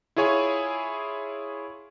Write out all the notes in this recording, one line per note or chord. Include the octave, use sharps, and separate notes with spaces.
E4 F4 G#4 C#5 G#5